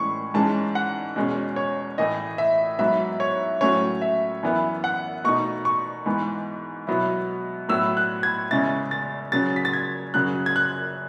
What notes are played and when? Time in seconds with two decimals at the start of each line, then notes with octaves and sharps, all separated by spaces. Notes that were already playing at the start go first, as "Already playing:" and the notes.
Already playing: A2 E3 G#3 C#4 C#6
0.34 G#2 E3 G#3 C#4 A5
0.75 F#5
1.16 E2 B2 G#3 C#4
1.56 C#5
1.98 A2 E3 A3 D#5
2.38 E5
2.79 G#2 F#3 B3 E5
3.20 C#5
3.61 A2 F#3 A3 C#4 C#5
4.02 E5
4.43 F#2 E3 B3 E4
4.84 F#5
5.24 B2 A3 D#4 C#6
5.65 C#6
6.06 G#2 E3 B3
6.87 B2 F#3 B3 E4
7.69 A2 F#3 B3 E4 E6
7.97 F#6
8.23 G#6
8.51 E2 C#3 G#3 C#4 E4 A6
8.91 A6
9.32 C#3 F#3 C#4 A6
9.56 B6
9.65 A6
9.73 G#6
10.14 F#2 C#3 F#3 F#6
10.46 G#6
10.56 F#6